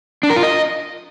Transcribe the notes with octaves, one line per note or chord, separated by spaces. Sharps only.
D4
A#4
F4
D#5